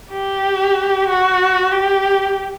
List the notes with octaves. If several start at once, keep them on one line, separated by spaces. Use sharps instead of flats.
G4
F#4
G4